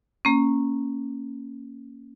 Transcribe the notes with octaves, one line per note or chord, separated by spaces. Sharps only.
A#3 C#4